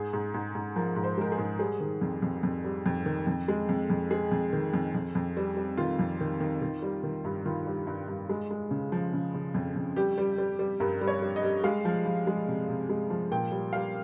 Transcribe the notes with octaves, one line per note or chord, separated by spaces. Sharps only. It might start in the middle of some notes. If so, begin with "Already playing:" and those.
Already playing: G#2 G#4
G#2
G#2
G#2
F3 A#4
G#2
C5
G#3 A#4
G#4
G#2
G3 G#4
D#3
F2
F2
F2
G3
F2
D#3
F2
G#3
F2
F2
G#3 G#4
F2
D#3
F2
F2
F2
G3
G3
D#3 F4
F2
D#3
D#3
D#3
G3
D#3
G2
D#3 F4
G3
G2
G2
G#3
G#3
C#3
F3
C#3
C#3
F2
F2
G3 G4
G3
G3
G3
G2 A#4
G3
C#5
G3
D#5
G3
G#3 F5
F3
F3
G#3
C3
C3
G#3
F3
A#2 G5
G3
G3 F5